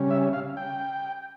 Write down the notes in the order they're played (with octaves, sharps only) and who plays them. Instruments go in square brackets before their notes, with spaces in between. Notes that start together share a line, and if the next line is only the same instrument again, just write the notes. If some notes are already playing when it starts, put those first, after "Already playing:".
Already playing: [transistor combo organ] C#3 G3 C#4
E5
F5
G5